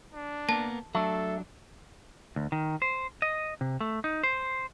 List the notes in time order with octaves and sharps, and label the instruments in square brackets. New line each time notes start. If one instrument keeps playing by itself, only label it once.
[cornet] D4
[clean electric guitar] A#3 B3 A#4 [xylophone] A5
[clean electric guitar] F#3 D4 [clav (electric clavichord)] A3 [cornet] A4
[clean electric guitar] D2
D#3
C5
D#5
C3
A3
D#4
C5